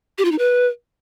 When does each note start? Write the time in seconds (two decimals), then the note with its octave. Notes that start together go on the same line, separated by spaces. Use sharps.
0.18 G4
0.25 F4
0.32 D#4
0.38 B4